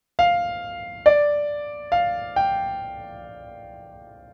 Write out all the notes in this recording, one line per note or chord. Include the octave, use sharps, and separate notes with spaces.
F5
D5
F5
G5